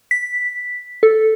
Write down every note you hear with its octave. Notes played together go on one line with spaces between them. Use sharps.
B6
A4